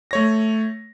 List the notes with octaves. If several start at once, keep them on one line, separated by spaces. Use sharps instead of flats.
A3 C#5 A#6